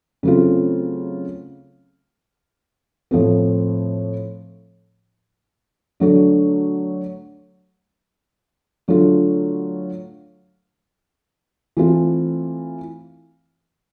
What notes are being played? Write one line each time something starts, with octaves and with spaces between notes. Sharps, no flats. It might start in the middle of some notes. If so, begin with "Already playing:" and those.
C#3 F#3 A3 C4 F4
A2 F3 A3 C4
D3 F#3 A3 D4
D3 F#3 A3 D4 F4
E3 A3 C4 F4 A4